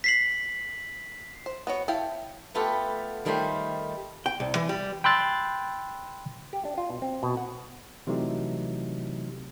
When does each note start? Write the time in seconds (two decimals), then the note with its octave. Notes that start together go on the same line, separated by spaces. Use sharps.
0.04 B6 C7 F#7
1.46 C5
1.67 B3 F#4 C#5
1.88 E4 F5 G5 A5
2.54 A3 B3 F4 G4 A4 B4
3.25 D#3 G3 A3 F4 C5
4.26 G5
4.40 C2
4.55 E3
4.69 G3
5.04 G5 B5 C6 E6 F#6 A6
6.53 G4
6.65 D4
6.77 F4
6.90 B2
7.02 C4
7.23 B2
7.37 F#5
8.07 C3 E3 F#3 A3 D#4 G4